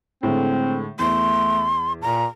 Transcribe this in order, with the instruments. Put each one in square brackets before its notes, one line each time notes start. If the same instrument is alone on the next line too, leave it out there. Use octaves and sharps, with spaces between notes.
[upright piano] A2 D3 G#3 [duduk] C4
[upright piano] E2 [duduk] A3 [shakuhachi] C6
[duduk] A#2 [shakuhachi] A#5